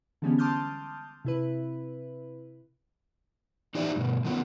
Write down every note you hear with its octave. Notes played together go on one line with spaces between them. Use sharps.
D3 E3 G3 G#3 B3 C#4
A5 C6 D6 D#6 F6 G6
C3 E4 B4
E3 D#4 G4 C5 D5 E5
G2 B2
D#3 F#3 B3 F4